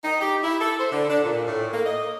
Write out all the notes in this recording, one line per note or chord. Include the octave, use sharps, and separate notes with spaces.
D#4
G4
E4
A4
C5
D3
D4
A#2
A2
A#3
D#5